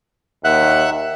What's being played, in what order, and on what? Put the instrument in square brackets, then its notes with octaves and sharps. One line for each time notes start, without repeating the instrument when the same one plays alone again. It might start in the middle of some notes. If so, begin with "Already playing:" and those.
[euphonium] D#2 [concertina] E5 F#5 F#6